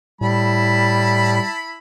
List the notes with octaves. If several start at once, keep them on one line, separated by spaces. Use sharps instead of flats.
A2 G3 E4 A5 B5